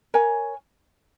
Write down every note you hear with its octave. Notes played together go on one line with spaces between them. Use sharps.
A#4 C#5 G#5